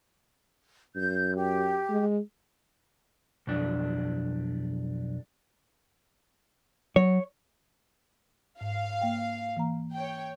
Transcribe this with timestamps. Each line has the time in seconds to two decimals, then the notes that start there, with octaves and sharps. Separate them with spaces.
0.96 F#2 G6
1.36 G4
1.89 G#3
3.47 B1 F2 D4
6.96 F#3 C#5
8.61 G#2 F5
9.02 A#3 G5
9.57 E3 A#3 A#5
9.93 C#5 G5